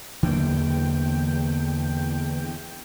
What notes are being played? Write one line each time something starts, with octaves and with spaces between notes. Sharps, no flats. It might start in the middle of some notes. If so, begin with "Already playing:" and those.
E2 D3 F#3 A#3 G5